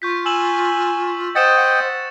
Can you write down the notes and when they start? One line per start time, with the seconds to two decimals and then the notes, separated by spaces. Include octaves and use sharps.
0.02 F4 C#6 G6 B6
0.26 G#5 E6 E7 F#7
1.35 C5 D#5 F#5 G5 A6 C#7 E7
1.58 F#5